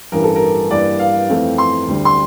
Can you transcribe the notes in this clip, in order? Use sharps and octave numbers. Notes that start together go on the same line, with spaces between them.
A1 G2 E3 A#4
A4
A#4
G2 E3 A#3 D4 D5
F5
F2 E3 A3 C4
C6
D2 D3 G3
C6